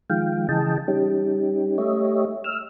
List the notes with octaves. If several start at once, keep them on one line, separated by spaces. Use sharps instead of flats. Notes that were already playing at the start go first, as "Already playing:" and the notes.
D#3 F3 G#3 F5 G5
C#3 E3 G#4 D#5 G5 A5
G3 C#4 D#4 G4
A3 G4 C#5 D#5 E5
E6 F6